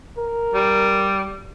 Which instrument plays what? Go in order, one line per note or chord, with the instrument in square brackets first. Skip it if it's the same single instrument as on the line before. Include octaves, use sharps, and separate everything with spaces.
[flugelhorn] A#4
[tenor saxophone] G3